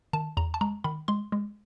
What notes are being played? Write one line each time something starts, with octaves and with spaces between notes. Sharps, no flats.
D#3 A5
E2 A#5
A5
G#3 A#5
D#3 B5
G#3 C6
G#3